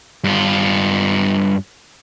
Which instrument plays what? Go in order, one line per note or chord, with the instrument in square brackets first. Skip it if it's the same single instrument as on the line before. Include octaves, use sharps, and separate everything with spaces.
[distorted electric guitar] G2 F4